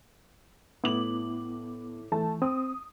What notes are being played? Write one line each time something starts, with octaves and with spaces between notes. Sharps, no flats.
A2 B3 E4 D6 F#7
E3 A3 A5
C4 D#6